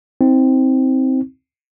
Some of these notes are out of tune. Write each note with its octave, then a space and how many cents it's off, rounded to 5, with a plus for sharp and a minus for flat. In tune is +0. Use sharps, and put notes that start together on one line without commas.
C4 +0 D#4 +40